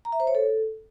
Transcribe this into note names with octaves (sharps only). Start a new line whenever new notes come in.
A#5
E5
C5
C#5
A4